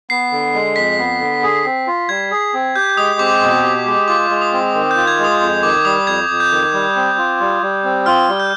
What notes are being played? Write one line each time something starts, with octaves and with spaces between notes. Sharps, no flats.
B3 C7
D3
G#3
F2 B6
B3
D3
G#4
C4
F4
G3 G#6
G#4
C4
G4 G6
G#3 D#6
C4 D6
B2
G4
G#3
F4 D6
G#3
D#6
C4
D#3
G6
F4
G#6
G#3
D#6
F2
D#3 D6
G3 D#6
F2 G#6
F2
G6
D#3
G3
C4
F4
G3
G3
C4
F4 F6
G3
G6